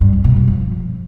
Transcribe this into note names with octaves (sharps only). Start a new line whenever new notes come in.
G2
F2
B2
G3
F3